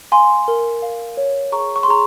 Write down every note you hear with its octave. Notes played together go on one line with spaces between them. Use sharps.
F5 G#5 C6
A#4
F5
C#5
G#4 A#5 C#6
C#6
C6
G#4 A#5 C#6